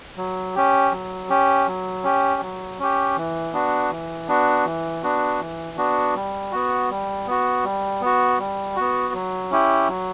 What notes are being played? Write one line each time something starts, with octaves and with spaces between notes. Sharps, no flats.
F#3
C#4 G4
F#3
C#4 G4
F#3
C#4 G4
F#3
C#4 G4
E3
B3 D4 F#4
E3
B3 D4 F#4
E3
B3 D4 F#4
E3
B3 D4 F#4
G3
B3 F#4
G3
B3 F#4
G3
B3 F#4
G3
B3 F#4
F#3
C#4 E4 G4
F#3